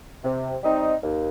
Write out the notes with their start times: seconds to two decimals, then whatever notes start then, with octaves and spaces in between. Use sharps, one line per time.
0.23 C3
0.62 G3 C4 D#4
1.02 D#2